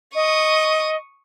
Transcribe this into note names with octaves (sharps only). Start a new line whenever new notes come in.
D#5 C#6 D#6